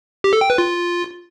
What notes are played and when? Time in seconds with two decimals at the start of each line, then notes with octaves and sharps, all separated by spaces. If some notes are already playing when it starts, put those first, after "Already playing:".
0.24 G4
0.33 A4
0.41 G5
0.50 B4
0.58 F4